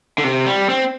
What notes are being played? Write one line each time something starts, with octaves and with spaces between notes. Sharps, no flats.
D3
C3
G3
C4